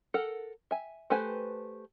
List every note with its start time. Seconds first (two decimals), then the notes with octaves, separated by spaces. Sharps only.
0.14 A4 A#4 F#5
0.71 E5 G#5
1.10 A3 G4 B4 C5 G#5